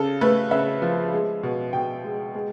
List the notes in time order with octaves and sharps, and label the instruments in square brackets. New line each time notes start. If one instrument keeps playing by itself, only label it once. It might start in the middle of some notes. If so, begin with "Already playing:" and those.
Already playing: [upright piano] C#3 A4
A3 B4
C#3 E5
F3
G#3
B2
B2 G5
G#3
G#3